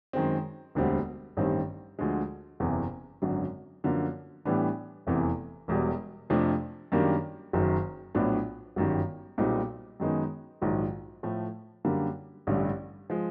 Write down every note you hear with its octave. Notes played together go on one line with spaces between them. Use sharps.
F#2 D#3 G#3 C4
E1 D2 D3 G3 C4
A1 G2 D#3 G3 C4
D2 D3 F3 G#3
F#1 E2 C3 E3
G#1 F#2 D3 F#3
F#2 D3 F3 A#3
A2 E3 G3 B3 D4
F1 E2 C3 E3
E1 E2 B2 G3
F2 C3 F3 A3 D4
F#2 D#3 G3 A#3 D4
F#1 F#2 D#3 F#3
A#1 A2 F#3 B3 D4
G1 F#2 D#3 G3
B1 A#2 G3 C4 D#4
F#2 D#3 G#3 B3 D#4
A#1 G#2 D#3 F#3
A2 F3 A3
F#2 D3 G3 A#3
A1 G2 D3 G3
F3 G#3